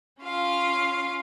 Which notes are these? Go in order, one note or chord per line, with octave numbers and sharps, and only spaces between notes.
C#4 F4 F5